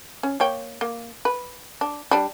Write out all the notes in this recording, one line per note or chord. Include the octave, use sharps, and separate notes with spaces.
C#4
A#3 C#5 G5
A#3
B4
D4
G3 D4